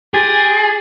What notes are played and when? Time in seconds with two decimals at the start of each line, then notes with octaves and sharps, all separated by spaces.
0.14 F4 G4 G#4 G#5 A6